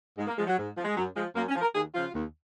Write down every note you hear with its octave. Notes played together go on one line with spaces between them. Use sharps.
G#2 G#3
A#3
F3 G#3
F#3
G#2
F3
G#3
F#2 F#3
F3 G#3
F#2 A#3
C#4
F3
A#4
D#2 G#4
C#3 F3 F4
D#2